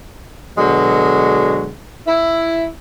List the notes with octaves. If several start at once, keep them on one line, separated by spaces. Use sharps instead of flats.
B2 D3 F#3 G#3
E4